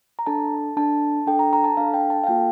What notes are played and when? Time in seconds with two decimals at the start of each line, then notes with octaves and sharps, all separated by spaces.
0.19 A#5
0.26 D4 A4 A5
0.77 D4 A4 A5
1.27 D4 A4 G5
1.39 A#5
1.53 A#5
1.64 A5
1.77 D4 A4 F5
1.94 G5
2.10 A5
2.24 F5
2.27 A#3 F4 A4 G5